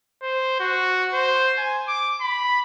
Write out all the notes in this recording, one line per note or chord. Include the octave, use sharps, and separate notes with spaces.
C5
F#4
C5
G#5
D6
B5